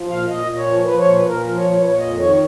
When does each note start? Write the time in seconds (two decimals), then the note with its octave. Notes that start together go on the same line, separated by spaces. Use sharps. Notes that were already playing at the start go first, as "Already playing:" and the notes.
Already playing: F3
0.08 A#2 F5
0.27 A#2 D#5
0.46 A#2
0.56 C#5
0.66 F3
0.85 F3 B4
0.99 C#5
1.04 A#2
1.13 B4
1.23 A#2
1.28 A#4
1.42 F3 A#4
1.56 A#2 C#5
1.70 C#5
1.80 A#2 B4
1.85 C#5
1.98 F2 D#5
2.18 D#3 C#5